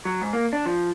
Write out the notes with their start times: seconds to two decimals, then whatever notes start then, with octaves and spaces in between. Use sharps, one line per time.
0.05 F#3
0.21 G#2
0.33 A#3
0.53 D4
0.66 F3